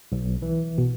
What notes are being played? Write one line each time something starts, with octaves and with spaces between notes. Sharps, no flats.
B1
E3
B2